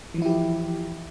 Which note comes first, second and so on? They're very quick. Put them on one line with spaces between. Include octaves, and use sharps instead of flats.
E3 F3 E4 G4